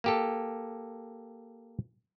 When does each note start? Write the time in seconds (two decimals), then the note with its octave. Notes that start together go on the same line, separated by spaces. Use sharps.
0.04 A#3 G4 A4